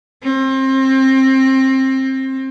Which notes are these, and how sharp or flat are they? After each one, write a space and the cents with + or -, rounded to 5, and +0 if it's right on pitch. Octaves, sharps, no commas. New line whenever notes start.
C4 +25